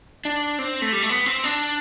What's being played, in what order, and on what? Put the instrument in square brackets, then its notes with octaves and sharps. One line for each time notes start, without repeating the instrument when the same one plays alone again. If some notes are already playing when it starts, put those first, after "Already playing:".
[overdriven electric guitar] D4
C4
A3
G3
A3
B3
C4
D4